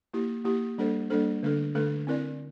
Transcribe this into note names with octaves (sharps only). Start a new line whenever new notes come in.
A#3 E4 G4
A#3 E4 G4
G3 A#3 D4 A4 C5
G3 A#3 D4 A4 C5
D3 A3 D4 A4
D3 A3 D4 A4
C4 E4 A#4 D5